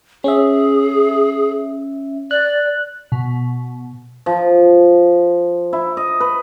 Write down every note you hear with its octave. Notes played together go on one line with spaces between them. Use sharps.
C#4 G#4 E5
D5 F#6
B2
F3
E4
D#5
B4